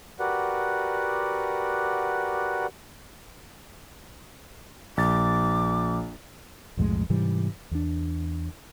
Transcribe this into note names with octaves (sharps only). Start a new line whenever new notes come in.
F#4 G4 A#4 B4 D5 F#5
A#1 D6 A6
B1 F2 A2 G#3
G#2 C3 E3 G3
E2 D4